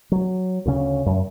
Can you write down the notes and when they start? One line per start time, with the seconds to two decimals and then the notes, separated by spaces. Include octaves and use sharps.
0.12 F#3
0.66 D2 C#3 C#4
1.06 F#2